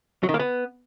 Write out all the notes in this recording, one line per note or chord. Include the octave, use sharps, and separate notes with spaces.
F#3
D#3
A#3
B3